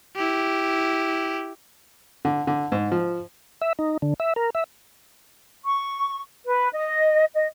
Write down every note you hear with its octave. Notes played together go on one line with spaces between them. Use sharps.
E4 G4
D3
D3
G#2
F3
E5
D#4
D3
E5
A#4
E5
C#6
B4
D#5
D#5